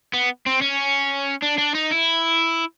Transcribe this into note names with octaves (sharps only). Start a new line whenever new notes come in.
B3
C4
C#4
D4
D4
D#4
E4